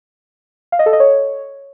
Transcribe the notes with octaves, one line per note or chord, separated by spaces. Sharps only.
F5
D#5
A4
D#5
C#5